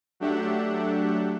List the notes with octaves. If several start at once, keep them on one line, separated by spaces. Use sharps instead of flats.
F#3 A3 D4 G4 E5 F#5